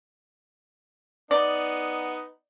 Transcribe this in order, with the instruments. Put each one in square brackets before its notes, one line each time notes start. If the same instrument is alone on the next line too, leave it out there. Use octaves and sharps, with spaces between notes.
[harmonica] B3 D#4 [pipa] D5